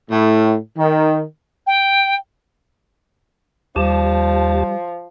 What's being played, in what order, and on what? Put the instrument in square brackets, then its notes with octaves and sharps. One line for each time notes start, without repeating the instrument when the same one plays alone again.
[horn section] A2
D#3
[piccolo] G5
[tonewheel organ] D#2 G4 A5 [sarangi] F3 [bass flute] G3